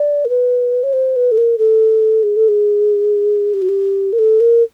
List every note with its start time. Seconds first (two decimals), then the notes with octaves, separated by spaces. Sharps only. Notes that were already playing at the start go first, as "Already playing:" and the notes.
Already playing: D5
0.25 A#4
0.29 B4
0.83 C#5
0.93 C5
1.16 B4
1.31 A4
1.38 A#4
1.58 A4
2.23 G#4
2.36 A4
2.48 G#4
3.54 G4
3.62 F#4
3.69 G4
4.13 A#4
4.19 A4
4.40 A#4